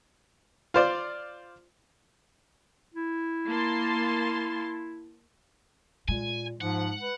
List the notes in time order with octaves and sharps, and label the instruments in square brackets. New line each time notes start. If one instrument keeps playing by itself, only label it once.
[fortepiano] F4 C5 D5
[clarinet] E4
[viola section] A#3 A5 C6
[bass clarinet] A#2 [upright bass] G#3 [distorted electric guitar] G#5
[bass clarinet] G#2 [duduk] F3 [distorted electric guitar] F#5
[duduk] B4